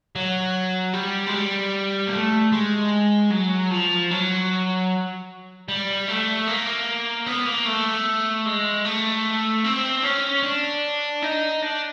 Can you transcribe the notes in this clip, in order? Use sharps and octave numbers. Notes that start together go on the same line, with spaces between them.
F#3
G3
G#3
G3
A#3
A3
G#3
F#3
F3
F#3
G3
A3
A#3
B3
A#3
A3
G#3
A3
C4
C#4
D4
D#4
D4